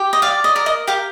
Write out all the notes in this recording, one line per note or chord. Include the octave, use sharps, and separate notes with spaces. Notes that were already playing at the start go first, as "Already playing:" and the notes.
Already playing: G4
D#5
D5 F5
D#5
A#4
D#5
G4 F5